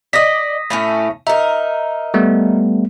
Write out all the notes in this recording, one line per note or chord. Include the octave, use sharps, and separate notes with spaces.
D5 D#5 D#6 A#6 B6
A2 A3 C#4
D#4 A#4 E5
G3 A3 B3